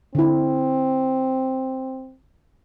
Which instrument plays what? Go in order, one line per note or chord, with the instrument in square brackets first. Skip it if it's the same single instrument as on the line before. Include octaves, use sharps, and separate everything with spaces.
[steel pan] D3 E4 [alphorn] C4